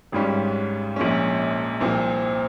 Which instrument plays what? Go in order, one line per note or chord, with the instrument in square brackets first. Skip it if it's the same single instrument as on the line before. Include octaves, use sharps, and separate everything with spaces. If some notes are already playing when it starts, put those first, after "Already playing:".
[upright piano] G#1 G#2 G3 C#4
A#1 A#2 G#3 C#4
C2 A#2 F3 C4